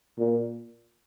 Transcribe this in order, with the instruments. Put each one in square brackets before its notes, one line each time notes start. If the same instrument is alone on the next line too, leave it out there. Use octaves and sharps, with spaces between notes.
[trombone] A#2